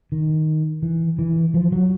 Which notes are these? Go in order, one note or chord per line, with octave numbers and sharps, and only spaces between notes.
D#3
E3
E3
F3
F#3